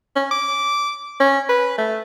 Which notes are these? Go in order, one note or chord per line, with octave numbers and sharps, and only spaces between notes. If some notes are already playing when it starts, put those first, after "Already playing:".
C#4
D6
C#4
B4
A3